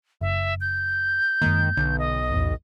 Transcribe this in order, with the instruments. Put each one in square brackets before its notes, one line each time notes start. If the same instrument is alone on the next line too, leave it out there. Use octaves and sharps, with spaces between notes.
[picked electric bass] F#1 [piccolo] E5
[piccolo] G6
[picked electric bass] F#2 G#3 A#3 [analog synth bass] D#3
[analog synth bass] B1 [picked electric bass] D3
[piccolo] D#5
[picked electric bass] D#1 A1 E2